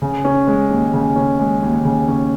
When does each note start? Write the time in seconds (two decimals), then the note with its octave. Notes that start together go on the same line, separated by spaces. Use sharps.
0.02 C#3
0.24 C#4
0.47 G#3
0.70 D#2
0.93 C#3
1.16 C#4
1.39 G#3
1.63 D#2
1.85 C#3
2.08 C#4